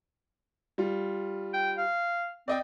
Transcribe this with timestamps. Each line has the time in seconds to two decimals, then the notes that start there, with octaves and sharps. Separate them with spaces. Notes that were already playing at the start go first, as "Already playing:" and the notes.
0.78 G3 F4
1.54 G5
1.78 F5
2.48 C4 D5 D#5 G5